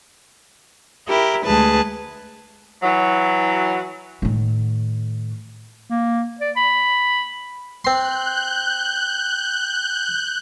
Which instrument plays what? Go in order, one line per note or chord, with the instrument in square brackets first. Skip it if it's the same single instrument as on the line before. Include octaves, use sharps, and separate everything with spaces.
[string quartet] E4 G4 A#4
D2 G#3 G#4 B4 A5
[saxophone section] E3 F#3
[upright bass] A2 D#3
[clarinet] A#3
D5
B5
[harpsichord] C4 C6 [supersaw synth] F#6 G6